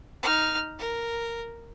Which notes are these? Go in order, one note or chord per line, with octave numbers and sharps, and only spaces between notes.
D#4 F6
A#4